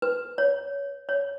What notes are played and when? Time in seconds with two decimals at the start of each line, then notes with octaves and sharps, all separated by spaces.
0.02 B4
0.38 C#5
1.09 C#5